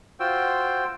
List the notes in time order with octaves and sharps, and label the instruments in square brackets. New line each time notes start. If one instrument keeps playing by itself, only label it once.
[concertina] F4 F#4 C5 G5 E6